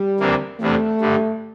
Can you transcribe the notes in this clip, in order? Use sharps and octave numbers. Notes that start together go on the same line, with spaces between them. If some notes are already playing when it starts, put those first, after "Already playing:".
Already playing: G3
D2 C3 E3 A#3 D4
E2 C3 G3 A3 D4
G2 D3 G3